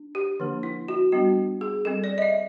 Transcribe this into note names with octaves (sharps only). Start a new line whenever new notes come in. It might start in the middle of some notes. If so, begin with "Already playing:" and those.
Already playing: D4
G4
D3 F3 A#3 D4
E4
F#4
G3 B3 D4 F#4
G#4
G3 C4 A4
D5
D#5
E5